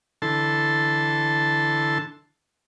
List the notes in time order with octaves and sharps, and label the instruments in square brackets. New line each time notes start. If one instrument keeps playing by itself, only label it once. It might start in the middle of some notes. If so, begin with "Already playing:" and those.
[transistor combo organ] D3 E3 A4 A5 C6